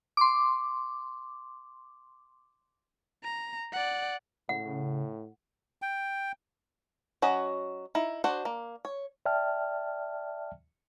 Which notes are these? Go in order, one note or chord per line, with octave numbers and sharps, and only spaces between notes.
C6 D6
A#5
D5 F#5
A2 C#3 F#5
G5
F#3 C#4 F#4 D#5
D#4 E4
D4 F#4 C5 F#5
A#3
C#5
D5 E5 G5 A5 F6